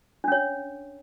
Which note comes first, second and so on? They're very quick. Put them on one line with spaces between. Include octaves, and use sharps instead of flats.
D4 C#4 C#5